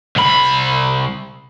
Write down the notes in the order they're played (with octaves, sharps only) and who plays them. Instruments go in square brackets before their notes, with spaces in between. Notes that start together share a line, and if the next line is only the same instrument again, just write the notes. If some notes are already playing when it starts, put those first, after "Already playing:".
[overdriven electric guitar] C2 B5